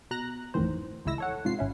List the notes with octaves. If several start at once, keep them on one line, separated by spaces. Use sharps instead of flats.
B2 A#5 F#6 A#6
A1 F2 A2 D#3 E3 C5
G#1 C#2 G#3 E4 E6 A#6
A4 C#5 F#5
G#2 C3 F4 C7
G#1 C#4 E4